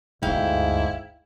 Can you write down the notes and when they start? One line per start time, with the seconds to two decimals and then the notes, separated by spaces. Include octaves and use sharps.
0.23 G1 D2 G#2 E4 F5 G5